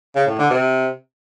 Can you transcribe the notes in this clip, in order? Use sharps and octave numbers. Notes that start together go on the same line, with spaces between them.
C#3
A2
D3
C3